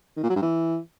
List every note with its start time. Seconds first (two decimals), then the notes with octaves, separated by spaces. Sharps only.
0.17 D#3
0.23 A#2
0.29 F#3
0.36 G2
0.42 E3